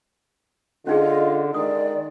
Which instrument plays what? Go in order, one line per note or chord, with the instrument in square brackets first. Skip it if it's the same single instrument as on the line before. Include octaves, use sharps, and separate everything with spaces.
[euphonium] D3 [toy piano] C#4 D#4 G#4 [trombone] F4 [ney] D#5
[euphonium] D#3 [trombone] G#3 [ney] D5 [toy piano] D#6